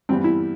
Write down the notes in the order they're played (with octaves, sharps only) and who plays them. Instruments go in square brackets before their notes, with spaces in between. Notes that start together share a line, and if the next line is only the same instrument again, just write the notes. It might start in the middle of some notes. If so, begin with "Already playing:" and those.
[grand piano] G2 E3 G3 B3 [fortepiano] C4
[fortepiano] E4